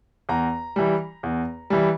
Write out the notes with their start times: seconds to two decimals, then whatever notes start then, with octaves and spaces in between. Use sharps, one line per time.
0.29 E2 A#5
0.76 E3 G3
1.23 E2
1.70 E3 G3